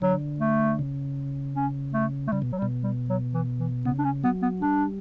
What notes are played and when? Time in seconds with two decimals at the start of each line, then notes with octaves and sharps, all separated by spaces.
0.02 D3 F#3
0.40 A3
0.79 C#3
1.55 C#4
1.94 A3
2.27 A3
2.32 C#3 G3
2.42 B2
2.53 F#3
2.58 G3
2.62 B2
2.83 G3
3.09 F#3
3.34 E3
3.60 E3
3.85 C#3 B3
3.99 D4
4.04 C#4
4.24 F#3 B3
4.42 B3
4.62 G3 D4